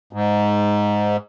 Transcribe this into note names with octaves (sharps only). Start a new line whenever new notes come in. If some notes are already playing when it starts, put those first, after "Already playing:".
G#2